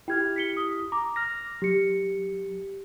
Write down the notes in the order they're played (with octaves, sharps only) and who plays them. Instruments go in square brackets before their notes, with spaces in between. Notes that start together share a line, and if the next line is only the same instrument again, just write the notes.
[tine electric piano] E4 G4 F6 [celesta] G5 G#6
[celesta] B6 C#7 G7
D#6
[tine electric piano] A#5 [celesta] D6
[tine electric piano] F6 A#6
[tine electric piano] F#3 [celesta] G4 C#7